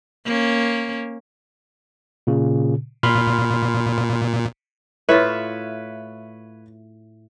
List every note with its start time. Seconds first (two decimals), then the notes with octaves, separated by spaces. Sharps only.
0.25 A#3 C#4
2.27 A#2 C#3
3.03 A#2 B5 C6 F6
5.09 A2 F4 B4 C#5 E5